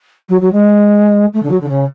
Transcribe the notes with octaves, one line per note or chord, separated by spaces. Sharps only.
F#3
F#3
G#3
A3
D3
F#3
D3
C#3